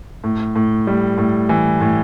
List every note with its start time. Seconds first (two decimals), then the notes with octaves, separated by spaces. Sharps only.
0.24 A2
0.55 A2
0.87 G3
1.18 A2
1.49 E3
1.81 A2